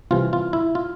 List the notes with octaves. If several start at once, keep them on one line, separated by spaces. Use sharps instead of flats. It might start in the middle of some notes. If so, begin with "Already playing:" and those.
C2 C3 E3 F4
F4
E4
F4